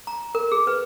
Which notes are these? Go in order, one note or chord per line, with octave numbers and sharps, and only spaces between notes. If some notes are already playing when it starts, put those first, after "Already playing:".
A#5
A#4
G#4
B4